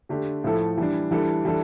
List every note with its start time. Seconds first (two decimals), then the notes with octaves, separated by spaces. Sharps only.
0.09 D3 A3 D4 G4
0.44 A2 F3 A3 E4 A4
0.78 E3 G3 D4
1.11 E3 G3 D4 A4
1.45 E3 G3 D4 A4